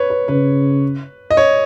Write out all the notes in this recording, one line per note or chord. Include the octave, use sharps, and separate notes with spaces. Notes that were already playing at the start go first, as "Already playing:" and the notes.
Already playing: B4 C#5
B4
C#3 B4
D#5
C#5